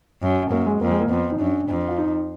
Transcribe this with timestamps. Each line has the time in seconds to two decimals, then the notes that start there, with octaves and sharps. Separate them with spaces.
0.22 F#2
0.51 F#2 A#3
0.66 G#3
0.81 F2 A#3
0.90 G#3
1.00 A#3
1.09 F2 B3
1.32 D#4
1.39 F#2 D4
1.69 F2
1.88 F4
1.98 D#4